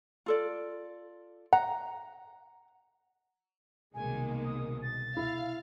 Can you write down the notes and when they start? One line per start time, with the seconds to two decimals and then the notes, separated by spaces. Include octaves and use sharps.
0.26 F4 A4 D5
1.53 F#5 A#5
3.94 C2 B2 D#3 G#3 A#3 G#5
4.45 D#6
4.82 A6
5.17 E4 F5